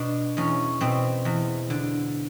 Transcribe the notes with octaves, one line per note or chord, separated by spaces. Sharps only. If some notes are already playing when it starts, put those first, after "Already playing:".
Already playing: B2 D4
E2 C#4
B2 C4
E2
D3